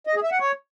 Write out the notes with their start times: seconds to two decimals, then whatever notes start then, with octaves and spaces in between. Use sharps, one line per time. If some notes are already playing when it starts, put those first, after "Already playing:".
0.07 D#5
0.15 G#4
0.23 E5
0.32 F#5
0.40 C#5